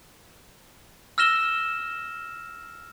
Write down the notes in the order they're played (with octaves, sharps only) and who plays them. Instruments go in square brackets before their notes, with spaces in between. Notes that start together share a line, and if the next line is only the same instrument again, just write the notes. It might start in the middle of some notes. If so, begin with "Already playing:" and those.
[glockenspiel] E6 F6 A#6 E7 G7